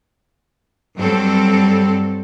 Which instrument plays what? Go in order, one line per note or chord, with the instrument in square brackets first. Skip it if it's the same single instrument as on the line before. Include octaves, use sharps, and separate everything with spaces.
[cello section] G2 F#3 G3 C4 A4